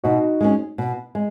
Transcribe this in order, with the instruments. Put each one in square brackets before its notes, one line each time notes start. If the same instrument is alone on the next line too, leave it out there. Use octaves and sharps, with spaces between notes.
[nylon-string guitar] B2 [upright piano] D#4 F#4
[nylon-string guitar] G#3 C#4
B2
G#3